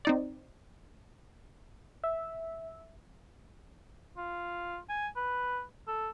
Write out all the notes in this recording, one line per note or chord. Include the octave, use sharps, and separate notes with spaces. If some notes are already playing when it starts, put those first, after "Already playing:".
C4 D#4 D5
E5
F4
G#5
B4
A4